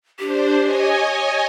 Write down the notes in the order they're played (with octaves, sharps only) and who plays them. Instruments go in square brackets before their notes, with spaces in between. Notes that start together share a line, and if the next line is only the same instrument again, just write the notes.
[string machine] D4 C5 [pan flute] G4
[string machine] C#5 D#5 G#5